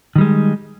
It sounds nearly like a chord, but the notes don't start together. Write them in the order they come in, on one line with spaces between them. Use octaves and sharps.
D#3 G3 G#3